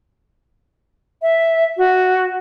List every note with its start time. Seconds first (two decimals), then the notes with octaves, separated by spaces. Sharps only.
1.22 E5
1.77 F#4